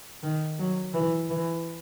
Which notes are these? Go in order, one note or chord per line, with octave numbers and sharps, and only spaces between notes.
D#3
F#3
E3
E3